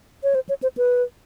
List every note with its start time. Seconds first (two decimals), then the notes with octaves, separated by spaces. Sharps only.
0.23 C#5
0.35 C5
0.49 C#5
0.63 C5
0.77 B4